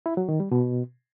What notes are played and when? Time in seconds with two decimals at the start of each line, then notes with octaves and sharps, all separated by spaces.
0.06 E4
0.17 F#3
0.29 D#3
0.40 G3
0.51 B2